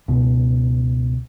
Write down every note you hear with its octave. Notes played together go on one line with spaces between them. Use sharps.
C#2 B2